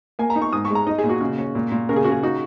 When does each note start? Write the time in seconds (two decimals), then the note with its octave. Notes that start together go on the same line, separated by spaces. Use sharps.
0.19 A#3 G#5
0.30 A#5
0.36 D#4
0.42 C#6
0.52 G#2 D#6
0.65 C#6
0.70 G#3
0.75 A#5
0.87 D#4 D#5
0.98 G#4
1.04 A#2
1.09 F#4
1.21 C#3
1.38 C#4
1.55 A#2
1.72 A#2
1.89 C#3 A#4
1.96 G#4
2.04 C#3 F#4
2.12 G#4
2.23 D#4 F#4